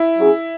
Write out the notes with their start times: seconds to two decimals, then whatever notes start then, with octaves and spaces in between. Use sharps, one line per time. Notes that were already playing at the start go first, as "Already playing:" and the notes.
Already playing: E4
0.18 F#3 C#4 G#4